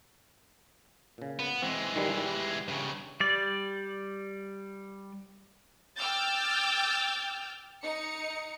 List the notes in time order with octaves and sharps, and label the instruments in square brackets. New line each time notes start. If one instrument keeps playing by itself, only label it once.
[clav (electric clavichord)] A#2 C#3
[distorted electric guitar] B3
[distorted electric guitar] E3 G#3 [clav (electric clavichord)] C4
[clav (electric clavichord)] D#3 G3
G3
[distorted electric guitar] G2 C#3
[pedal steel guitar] G3 D5
[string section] G5 D6 E6 F6 G6 A6
D#4 C#7